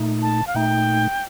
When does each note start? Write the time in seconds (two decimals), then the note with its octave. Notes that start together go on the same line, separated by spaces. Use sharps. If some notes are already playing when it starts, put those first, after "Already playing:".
Already playing: A#2 A3 D#4
0.22 A5
0.47 F5
0.54 A#2 A3 D#4 G5